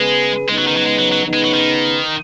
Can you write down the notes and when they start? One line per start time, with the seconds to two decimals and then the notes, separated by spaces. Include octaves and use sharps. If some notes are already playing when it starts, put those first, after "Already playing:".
Already playing: C#3 G#3 B3 G#4 B4
0.48 C#3 G#3 B3 D#4 B4
0.58 F#3
0.67 D#3
0.76 F#3
0.86 G#3
0.99 F#3
1.12 F#3
1.24 C#3 B3 D#4 B4
1.33 G#3
1.44 F#3
1.54 D#3